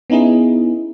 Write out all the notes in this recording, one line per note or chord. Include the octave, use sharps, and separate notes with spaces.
B3 C#4 D#4 E4 G#4